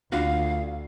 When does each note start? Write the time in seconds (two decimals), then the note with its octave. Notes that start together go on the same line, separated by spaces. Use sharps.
0.12 D2 D4 F4 F#4 F5